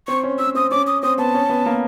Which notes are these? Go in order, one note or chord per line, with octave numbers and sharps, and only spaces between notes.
C4 C#6
C#4
C#4 E6
C4 D#6
C#4 D6
D#6
C4 D#6
B3 A5
C#4
B3
A#3